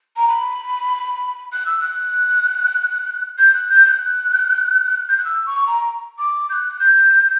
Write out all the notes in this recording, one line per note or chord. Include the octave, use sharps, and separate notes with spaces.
A#5
B5
F#6
E6
F#6
G6
F#6
G6
G6
F#6
G6
F#6
E6
C#6
A#5
D6
G6
F#6
G6